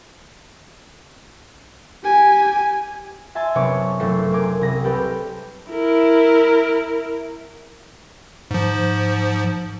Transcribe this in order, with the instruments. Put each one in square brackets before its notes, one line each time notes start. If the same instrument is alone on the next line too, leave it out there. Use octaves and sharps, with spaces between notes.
[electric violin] G4 G#5
[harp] E5 G#5 A5 C6
F#1 C3 B3 D4 C#5 D6
F#1 A3 A4 C7
A#4 G#5 C6 D6
C2 A#6
G3 C4 G4 A4 B4 G5
[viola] E4 A#4
[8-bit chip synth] G#2 F3